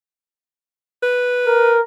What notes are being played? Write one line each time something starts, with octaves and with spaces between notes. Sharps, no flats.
B4
A#4